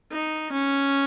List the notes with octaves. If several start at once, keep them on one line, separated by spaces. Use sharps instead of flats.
D#4
C#4